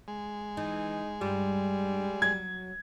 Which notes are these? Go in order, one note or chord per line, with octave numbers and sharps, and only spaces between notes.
G#3
E3 D#4
G2 G3 F4
F#3 G#6